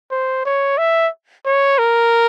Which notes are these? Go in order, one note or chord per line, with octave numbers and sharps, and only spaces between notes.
C5
C#5
E5
C#5
A#4